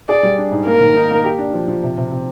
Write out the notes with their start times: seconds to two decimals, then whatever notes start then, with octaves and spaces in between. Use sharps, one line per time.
0.09 G#4 D5
0.23 G3
0.38 D4
0.52 G#2
0.67 A#3 A#4
0.80 D#3
0.96 D#4
1.11 A#3
1.24 G4
1.38 D4
1.54 F3
1.68 F3
1.83 C3
1.97 C3
2.11 C3